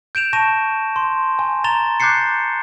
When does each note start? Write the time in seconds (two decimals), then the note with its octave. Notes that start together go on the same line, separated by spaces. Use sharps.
0.15 G6 D7 E7 F7
0.33 A5 C#6 A#6 D#7 E7
0.96 C6
1.39 G#5
1.64 A#5 A6 E7 F7 G7
2.00 D6 F#6 G6 A6 C7 C#7